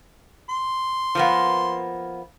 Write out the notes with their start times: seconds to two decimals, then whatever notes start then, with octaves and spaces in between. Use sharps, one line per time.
0.49 C6
1.15 F3 A#3 B3